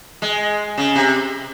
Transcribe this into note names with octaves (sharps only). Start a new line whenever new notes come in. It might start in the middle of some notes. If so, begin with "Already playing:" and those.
G#3
C#3
C3